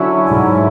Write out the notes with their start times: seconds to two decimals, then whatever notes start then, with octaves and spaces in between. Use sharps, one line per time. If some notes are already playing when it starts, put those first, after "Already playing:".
Already playing: D3 F#3 C#4 E4
0.28 G#2